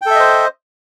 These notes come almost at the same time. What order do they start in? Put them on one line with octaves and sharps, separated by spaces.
G5 A4 E5 D#5 C5